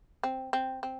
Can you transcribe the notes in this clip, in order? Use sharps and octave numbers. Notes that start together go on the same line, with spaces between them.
C4
C4
C4